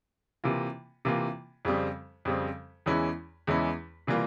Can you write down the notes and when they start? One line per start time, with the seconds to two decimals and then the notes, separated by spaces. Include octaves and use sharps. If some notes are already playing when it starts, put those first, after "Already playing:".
0.44 C3 E3 A#3 F4
1.05 C3 E3 A#3 F4
1.65 F2 C#3 G3 C4
2.25 F2 C#3 G3 C4
2.86 E2 E3 G#3 C#4 E4
3.47 E2 E3 G#3 C#4 E4
4.07 C3 E3 G3 A#3 F4